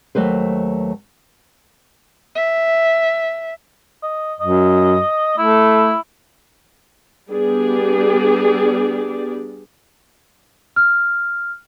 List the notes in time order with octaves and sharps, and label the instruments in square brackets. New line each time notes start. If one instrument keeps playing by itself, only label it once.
[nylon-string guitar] D#2 F#3 A3 B4 C5
[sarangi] E5
[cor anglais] D#5
[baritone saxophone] F#2 [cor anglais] D#5
[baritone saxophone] A3 [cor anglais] E4
[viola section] G3 B3 D4 G4 G#4 D5
[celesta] F6